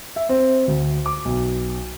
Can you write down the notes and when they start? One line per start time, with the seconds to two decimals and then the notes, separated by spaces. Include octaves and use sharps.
0.16 E5
0.29 C4
0.68 D2
1.06 D6
1.25 B1